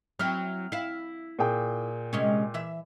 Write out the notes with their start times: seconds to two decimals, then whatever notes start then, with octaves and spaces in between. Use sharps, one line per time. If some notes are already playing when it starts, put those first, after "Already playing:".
0.19 F#3 C4 E4 F6
0.72 E4 F5
1.39 A#2 G#4 G5
2.13 C3 G#3 C#4
2.54 E3 E5